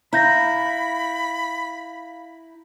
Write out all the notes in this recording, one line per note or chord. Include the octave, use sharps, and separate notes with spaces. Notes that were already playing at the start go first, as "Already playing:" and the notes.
E4 F5 A#5 B5 G6 A#6